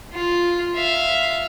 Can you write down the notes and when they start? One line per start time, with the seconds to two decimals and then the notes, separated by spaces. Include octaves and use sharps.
0.13 F4
0.76 E5 F5